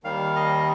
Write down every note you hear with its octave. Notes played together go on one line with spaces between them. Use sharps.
D#2 D#3 G3 F5
D#5